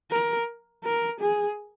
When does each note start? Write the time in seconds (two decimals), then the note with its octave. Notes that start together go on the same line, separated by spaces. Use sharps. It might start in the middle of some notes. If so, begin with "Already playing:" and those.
0.11 A#4
0.84 A#4
1.21 G#4